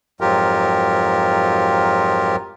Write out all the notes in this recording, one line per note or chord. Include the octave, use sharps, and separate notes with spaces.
F2 G#2 F#3 F4 G4 A#4